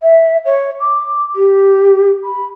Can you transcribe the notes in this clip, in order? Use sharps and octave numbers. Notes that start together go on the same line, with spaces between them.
E5
C#5
D6
G4
B5